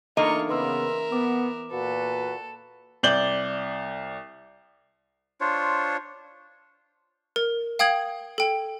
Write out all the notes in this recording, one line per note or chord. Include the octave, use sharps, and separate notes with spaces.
E2 A#3 D4 D#4 F4 A4 D#5 C#6
C#3 B3 A#4 B4 E5 C6 E6
B3 D6
A#2 F#4 A4 B4
C2 D5 G6 F#7 G7
D4 F4 C5 C#5
A#4
F5 G5 D#6 G#6 F#7
A4 G5